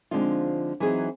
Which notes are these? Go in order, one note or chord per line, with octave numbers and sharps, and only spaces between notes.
D3 F3 G#3 C4 D#4 F4
E3 F#3 C4 D#4 G#4